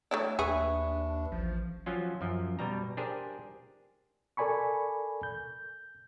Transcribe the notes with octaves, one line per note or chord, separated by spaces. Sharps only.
A3 D4 E4 C#5
D#2 D4 G#4 B4 E5 C#6
A1 F3
F3 F#3 C#4 F4
F#2 F3
B2 G3 A#5
D4 G4 G#4 A#4 C5
A4 A#4 D5 G#5 B5 C#6
G6